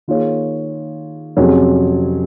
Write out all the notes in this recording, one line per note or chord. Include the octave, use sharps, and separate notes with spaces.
D#3 A#3 F4 G#4 C#5
F2 C3 F#3 C#4 G#4